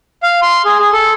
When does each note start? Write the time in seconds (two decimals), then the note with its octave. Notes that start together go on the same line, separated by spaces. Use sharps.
0.23 F5
0.42 C6
0.65 G#4
0.79 G#4
0.92 A4